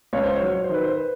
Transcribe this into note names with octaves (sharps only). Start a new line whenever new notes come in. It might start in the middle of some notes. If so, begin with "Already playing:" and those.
C#2 C#5
C5
C#5
F#3
C#5
C5
D#3 B4
C5
B4